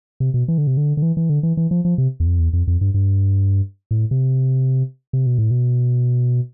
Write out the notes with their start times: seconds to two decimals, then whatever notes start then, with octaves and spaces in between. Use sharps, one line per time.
0.20 C3
0.34 B2
0.48 E3
0.58 D3
0.67 C3
0.77 D3
0.97 D3
1.02 E3
1.17 E3
1.30 D3
1.43 E3
1.57 E3
1.71 F3
1.85 F3
1.98 C3
2.20 E2
2.26 F2
2.39 E2
2.53 F2
2.67 F2
2.81 G2
2.94 G2
3.91 A2
4.11 C3
5.13 C3
5.26 B2
5.39 A2
5.51 B2